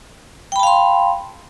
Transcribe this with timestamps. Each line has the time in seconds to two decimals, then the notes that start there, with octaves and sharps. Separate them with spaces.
0.52 G5
0.56 B5
0.59 A5
0.63 F5
0.67 C6